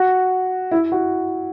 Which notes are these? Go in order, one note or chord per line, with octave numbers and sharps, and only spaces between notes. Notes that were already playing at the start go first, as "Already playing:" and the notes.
Already playing: F#4
E4
F#4